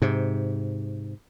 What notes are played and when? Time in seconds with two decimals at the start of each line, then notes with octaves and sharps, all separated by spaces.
0.02 G#2 C3